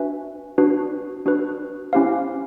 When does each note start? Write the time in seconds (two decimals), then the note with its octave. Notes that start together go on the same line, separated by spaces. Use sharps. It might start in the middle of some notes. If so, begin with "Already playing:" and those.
Already playing: D4 F#4 B4 E5 G#5
0.58 D4 F#4 B4
1.26 D4 F#4 B4
1.93 C#4 E4 G4 C5 F5